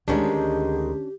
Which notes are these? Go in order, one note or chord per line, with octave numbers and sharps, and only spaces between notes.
D2 D3 D#3 G#3 C#4 D4 G4